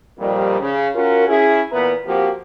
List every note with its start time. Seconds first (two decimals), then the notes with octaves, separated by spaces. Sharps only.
0.19 F2 A#2 D#3 F3 G3
0.60 C#3
0.95 C#4 F4 F#4 A#4
1.28 C#4 E4 G#4
1.72 A#2 E3 B3 B4 A#5
2.06 F3 A#3 C4 F#4 G4